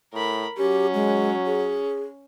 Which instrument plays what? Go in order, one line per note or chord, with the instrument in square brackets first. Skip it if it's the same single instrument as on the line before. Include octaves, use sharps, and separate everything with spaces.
[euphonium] A2 [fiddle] A#4 B5
[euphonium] F#3 [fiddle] C#4 [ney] G4
[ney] G#3
G#4